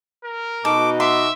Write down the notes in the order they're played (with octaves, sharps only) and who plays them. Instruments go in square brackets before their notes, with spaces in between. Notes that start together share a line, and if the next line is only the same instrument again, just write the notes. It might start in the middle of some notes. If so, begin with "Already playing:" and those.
[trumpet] A#4
[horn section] B2 D#4 F#4 [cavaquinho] A4 [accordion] D6
[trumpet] E5 [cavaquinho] C6 [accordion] D6